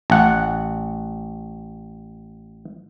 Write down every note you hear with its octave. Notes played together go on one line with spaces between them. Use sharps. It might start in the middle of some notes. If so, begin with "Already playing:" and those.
A1 F#5